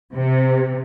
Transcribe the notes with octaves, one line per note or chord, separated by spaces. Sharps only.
C3